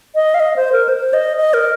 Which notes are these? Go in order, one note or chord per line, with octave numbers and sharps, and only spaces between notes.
D#5
F5
D#5
C5
A#4
C5
D#5
D#5
A#4